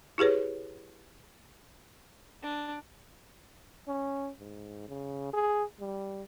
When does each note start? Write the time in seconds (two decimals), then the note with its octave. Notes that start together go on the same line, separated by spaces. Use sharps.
0.18 E4 G4 G#4 B4 C#5
2.43 D4
3.87 C#4
4.40 G#2
4.88 C#3
5.33 G#4
5.80 G3